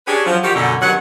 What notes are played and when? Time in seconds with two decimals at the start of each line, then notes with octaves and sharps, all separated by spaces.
0.08 C#4 D4 G4 G#4 B4 C#5
0.25 F3 F#3
0.43 D#3 F3 F#4 G4
0.55 F#2 B2 D3
0.82 G2 D#3 F#3 C#4 F#5